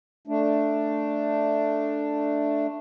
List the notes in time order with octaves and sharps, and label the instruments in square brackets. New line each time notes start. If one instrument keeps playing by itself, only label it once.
[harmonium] A3 D4